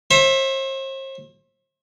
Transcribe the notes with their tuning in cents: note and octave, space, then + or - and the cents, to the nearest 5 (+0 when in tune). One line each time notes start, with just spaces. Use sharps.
C5 +40 E5 +0